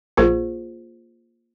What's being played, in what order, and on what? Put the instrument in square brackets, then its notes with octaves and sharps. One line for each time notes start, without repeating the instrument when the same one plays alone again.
[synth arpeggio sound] A#1 A#2 [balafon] A#3 F4 G#4 C5